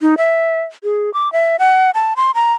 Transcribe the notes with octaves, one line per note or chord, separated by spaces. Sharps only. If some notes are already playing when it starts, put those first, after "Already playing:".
D#4
E5
G#4
D6
E5
F#5
A5
C6
A#5